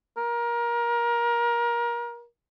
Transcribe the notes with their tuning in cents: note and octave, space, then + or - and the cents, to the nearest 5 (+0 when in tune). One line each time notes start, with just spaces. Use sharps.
A#4 +25